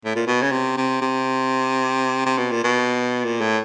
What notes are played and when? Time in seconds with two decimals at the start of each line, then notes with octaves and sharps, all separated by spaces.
0.05 A2
0.16 A#2
0.27 B2
0.42 C#3
0.52 C3
0.77 C3
1.01 C3
2.26 C3
2.38 B2
2.51 A#2
2.64 B2
3.25 A#2
3.41 A2